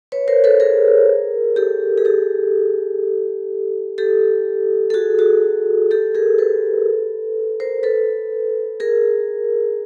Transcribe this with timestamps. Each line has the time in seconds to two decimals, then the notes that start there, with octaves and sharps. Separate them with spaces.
0.12 B4 C#5
0.28 A#4 C5
0.44 A4 B4
0.60 G#4 A#4
1.56 G4 A4
1.98 G#4
2.05 G4 A4
3.98 G4 A4
4.90 A4
4.94 F#4 G#4
5.19 F#4 G#4
5.91 G4 A4
6.15 G#4 A#4
6.38 A4 B4
7.60 A#4 C5
7.83 A4 B4
8.80 G#4 A#4